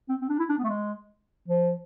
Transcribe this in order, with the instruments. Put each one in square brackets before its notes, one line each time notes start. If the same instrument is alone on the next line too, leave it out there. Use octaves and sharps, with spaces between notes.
[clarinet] C4
C4
D4
E4
D4
B3
A3
G#3
F3